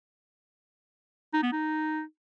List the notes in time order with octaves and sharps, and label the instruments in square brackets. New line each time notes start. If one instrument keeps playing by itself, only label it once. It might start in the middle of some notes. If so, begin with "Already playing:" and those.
[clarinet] D#4
B3
D#4